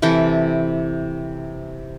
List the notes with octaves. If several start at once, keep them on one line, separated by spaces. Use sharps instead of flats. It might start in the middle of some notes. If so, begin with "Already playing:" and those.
C3 E3 A4 G5